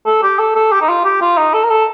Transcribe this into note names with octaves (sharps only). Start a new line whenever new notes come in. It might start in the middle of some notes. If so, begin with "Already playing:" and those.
A4
G4
A4
A4
G4
D#4
F4
G4
F4
D#4
A4
A#4
A4